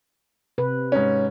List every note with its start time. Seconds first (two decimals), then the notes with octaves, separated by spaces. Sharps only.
0.58 C3 B4
0.92 G#2 C#4